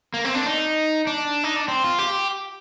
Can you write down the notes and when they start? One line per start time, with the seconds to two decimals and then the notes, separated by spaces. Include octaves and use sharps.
0.14 A#3
0.25 C4
0.35 D4
0.46 D#4
1.07 D4
1.44 D#4
1.56 D4
1.68 C4
1.83 F4
1.99 G4